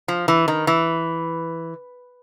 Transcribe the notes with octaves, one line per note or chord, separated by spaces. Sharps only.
F3
E3
D#3
E3